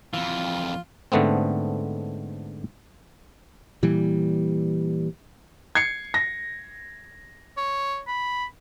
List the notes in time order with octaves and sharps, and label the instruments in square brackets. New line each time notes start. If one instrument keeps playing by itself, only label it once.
[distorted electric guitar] F2 E3 [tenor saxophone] F4
[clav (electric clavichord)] G#2 D3 A3 B3 C4
[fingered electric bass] A#2 E3 G3
[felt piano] G#6 C7 C#7
A#6
[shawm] C#5
B5